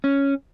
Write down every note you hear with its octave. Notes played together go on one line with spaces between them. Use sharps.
C#4